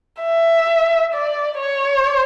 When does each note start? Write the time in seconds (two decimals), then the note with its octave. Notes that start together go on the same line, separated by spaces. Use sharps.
0.23 E5
1.14 D5
1.59 C#5